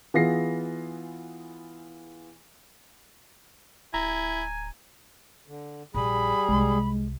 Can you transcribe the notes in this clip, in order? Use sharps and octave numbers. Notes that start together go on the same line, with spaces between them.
E3 B3 F4 G#4 A#6 C7
D1 E4 G#5 A#5
D3
A#1 G3 G#4 B5
C2 G#3